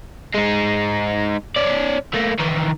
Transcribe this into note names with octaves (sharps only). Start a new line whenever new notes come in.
G#3 D#4
C#4 D5
A3 A#3
D#3 E3